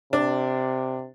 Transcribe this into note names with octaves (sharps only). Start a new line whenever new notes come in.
C3 D4